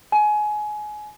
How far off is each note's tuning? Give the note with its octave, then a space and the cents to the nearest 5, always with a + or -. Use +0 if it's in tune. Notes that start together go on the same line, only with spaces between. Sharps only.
G#5 +25